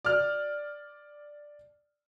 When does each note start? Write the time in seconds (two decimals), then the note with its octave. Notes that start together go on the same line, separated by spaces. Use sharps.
0.05 D5 F6